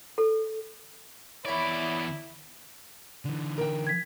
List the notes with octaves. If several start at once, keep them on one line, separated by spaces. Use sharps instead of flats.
A4
E2 E4 C#5 D5 B5
D3 E3
A#4 G5
G#6 B6